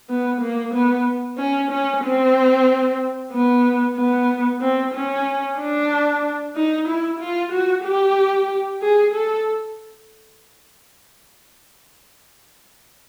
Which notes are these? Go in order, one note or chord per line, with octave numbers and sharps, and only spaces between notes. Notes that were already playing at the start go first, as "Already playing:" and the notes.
B3
A#3
B3
C#4
C#4
C4
B3
B3
C4
C#4
D4
D#4
E4
F4
F#4
G4
G#4
A4